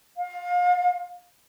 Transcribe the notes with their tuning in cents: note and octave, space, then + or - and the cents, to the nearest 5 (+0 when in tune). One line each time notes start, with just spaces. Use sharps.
F5 +30